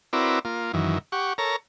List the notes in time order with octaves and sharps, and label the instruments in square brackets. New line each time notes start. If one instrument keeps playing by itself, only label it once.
[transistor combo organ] C4 E4 F#4 A#4 B4 D5
A#3 F4
F#2 D#3 E3
G4 F#5 C#6
A4 A#4 C#5 A#5